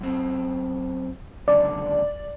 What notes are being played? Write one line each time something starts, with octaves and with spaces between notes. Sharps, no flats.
F#2 C4
C#2 F#2 D3 D5